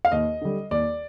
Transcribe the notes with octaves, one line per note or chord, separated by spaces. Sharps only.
F5
D#2 D#5
D3 G3
D#2 D5